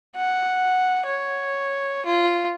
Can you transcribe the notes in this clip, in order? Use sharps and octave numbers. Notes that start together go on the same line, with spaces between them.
F#5
C#5
F4